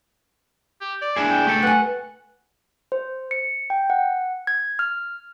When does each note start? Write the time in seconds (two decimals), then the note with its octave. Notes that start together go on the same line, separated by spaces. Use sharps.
0.81 G4
1.02 D5
1.16 D4 E4 G#4
1.30 G5
1.46 A3 G4 A4
1.63 B4 F#5 G#5
2.92 C5
3.31 C#7
3.70 G5
3.90 F#5
4.47 G#6
4.79 F6